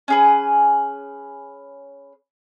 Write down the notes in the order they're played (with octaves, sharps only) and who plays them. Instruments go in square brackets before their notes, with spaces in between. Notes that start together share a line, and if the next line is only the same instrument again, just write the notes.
[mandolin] C#4 G#4 B4